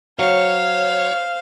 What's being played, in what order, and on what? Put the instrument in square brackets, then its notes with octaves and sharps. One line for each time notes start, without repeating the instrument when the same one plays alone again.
[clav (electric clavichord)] F#3 [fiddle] C5 F5 [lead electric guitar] C#5